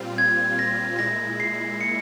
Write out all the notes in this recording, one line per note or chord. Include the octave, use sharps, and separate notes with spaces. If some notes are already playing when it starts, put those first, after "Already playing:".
Already playing: A#2 G3 C4 F4
G#6
A#6
A#2 G#3 E4 A#6
C7
C#7